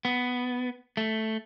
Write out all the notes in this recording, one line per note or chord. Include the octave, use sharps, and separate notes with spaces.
B3
A3